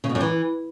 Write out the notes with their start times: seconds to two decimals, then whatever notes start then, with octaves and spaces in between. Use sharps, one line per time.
0.04 C#3
0.09 B2
0.15 F#2
0.21 E3